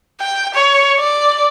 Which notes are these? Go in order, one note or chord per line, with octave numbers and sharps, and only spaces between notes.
G5
C#5
D5